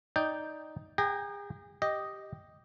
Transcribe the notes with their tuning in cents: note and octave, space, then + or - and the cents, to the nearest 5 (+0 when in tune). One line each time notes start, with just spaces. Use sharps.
D#4 +0 D5 +0 G5 +0
G#4 -40 G5 -10 A#5 +0
G4 +0 D#5 +0